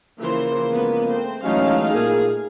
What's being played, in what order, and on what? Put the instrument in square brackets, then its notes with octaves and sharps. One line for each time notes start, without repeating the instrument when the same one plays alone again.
[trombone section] C#3 F3 A#3 [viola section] E3 C5
[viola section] G#3 B3 B4
[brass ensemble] A3 C4 [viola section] C5
[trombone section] E3 F#3 G#3 [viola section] A3 D#4 F5 [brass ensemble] C#4
[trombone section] A#2 A#3 [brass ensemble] G#4